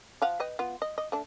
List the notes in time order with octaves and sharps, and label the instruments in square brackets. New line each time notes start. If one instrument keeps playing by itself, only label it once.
[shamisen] F3 F5 F#5
B4 D#5 G5
B3 F4
D#5
D#5
A3 D4